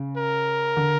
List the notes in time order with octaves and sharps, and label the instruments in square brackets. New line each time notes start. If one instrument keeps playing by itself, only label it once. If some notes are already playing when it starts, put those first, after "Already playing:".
Already playing: [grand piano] C#3
[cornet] A#4
[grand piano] D3